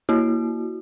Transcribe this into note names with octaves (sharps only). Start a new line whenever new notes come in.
A#3 E4 F#4